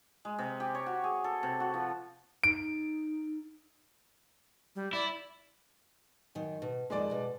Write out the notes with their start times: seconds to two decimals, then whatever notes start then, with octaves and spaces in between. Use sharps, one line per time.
0.25 G#3
0.39 C3
0.60 G4
0.75 C#5
0.86 F#4
1.04 G#4
1.24 A4
1.43 C3
1.60 F#4
1.74 F3
2.44 D#4 D7
4.76 G3
4.93 E4 D5
6.35 F#2 D#3
6.62 B2
6.90 F2 D#3 G#3 D5 A5
7.11 B2